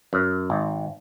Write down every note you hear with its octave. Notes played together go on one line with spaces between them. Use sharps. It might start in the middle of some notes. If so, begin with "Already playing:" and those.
F#2
G#1